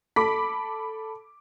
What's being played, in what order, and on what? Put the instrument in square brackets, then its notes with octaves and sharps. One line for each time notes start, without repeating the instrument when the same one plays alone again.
[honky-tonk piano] A4 B5 D6 B6